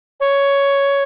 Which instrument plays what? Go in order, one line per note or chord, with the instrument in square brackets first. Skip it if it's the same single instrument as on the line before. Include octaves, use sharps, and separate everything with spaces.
[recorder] C#5